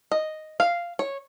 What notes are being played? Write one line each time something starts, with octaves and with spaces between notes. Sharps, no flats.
D#5
F5
C#5